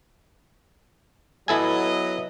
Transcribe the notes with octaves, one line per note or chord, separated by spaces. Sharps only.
F#3 B3 E4 A4 D#5 G#5